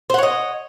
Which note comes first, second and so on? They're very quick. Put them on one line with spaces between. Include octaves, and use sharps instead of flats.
C5 F#5 C#5 D#5